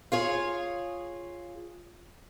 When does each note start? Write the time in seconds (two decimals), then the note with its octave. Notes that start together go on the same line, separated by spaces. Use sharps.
0.12 F4 G#4 C#5